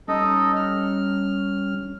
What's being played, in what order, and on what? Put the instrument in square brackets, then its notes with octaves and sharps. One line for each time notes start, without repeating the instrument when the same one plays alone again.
[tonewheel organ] G3 C#4 [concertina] D#4 A4 D#5
[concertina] F6